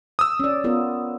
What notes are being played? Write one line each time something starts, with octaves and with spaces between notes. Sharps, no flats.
D#6 E6
C#4 D5
B3 F4 A#4